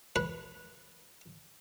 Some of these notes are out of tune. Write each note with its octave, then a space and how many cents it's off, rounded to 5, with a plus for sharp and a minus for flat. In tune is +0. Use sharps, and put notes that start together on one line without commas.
B4 -15